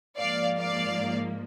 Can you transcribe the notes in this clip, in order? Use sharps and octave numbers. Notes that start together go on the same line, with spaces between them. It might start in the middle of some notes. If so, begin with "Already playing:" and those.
G#2 F3 A#3 D5 F5
D5 F5